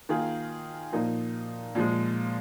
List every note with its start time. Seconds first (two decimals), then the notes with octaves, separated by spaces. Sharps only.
0.09 D#3 A#3 F4 G#4
0.93 A#2 F3 A#3 D#4
1.75 A#2 F3 G#3